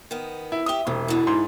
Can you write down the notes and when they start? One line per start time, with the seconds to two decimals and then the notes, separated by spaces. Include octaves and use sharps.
0.11 D#3 B3
0.52 E4
0.66 G4 E5 D#6 G7
0.87 E1 C3
1.08 B2 D3 E4
1.27 G#2 C6